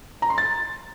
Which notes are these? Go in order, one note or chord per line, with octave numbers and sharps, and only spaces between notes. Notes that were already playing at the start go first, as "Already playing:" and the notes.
A#5
C6
A6